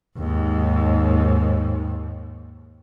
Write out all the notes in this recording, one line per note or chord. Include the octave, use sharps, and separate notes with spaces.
D#2 G#2